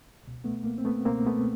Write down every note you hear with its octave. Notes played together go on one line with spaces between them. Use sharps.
C#2 B2
A3 B3
A#3
C4
A3 B3
C#2 B2 A#3 C4
A3 B3